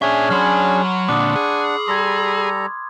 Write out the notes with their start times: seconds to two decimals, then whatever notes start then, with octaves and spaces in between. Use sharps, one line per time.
0.02 A#2 C#4 D4 G#4 E5 C#6
0.30 F#3 C#5 B5 C6 F6
1.09 A#2 D3 D4 F#5 D6 D#6
1.36 G#4
1.88 G3 A4 A#5 C6 G#6